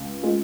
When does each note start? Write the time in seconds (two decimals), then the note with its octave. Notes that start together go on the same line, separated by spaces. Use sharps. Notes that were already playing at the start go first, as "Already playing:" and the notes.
Already playing: C#2
0.23 G#3 F4